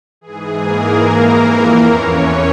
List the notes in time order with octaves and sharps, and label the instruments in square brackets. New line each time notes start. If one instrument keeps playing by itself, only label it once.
[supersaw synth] G#2 E3 G#4
A#3 A#4
F2 E3
E2 E3 C#4 C#5
C#5